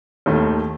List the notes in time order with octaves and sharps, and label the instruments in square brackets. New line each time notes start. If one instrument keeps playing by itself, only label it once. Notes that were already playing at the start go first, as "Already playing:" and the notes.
[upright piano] D#2 D#3 A3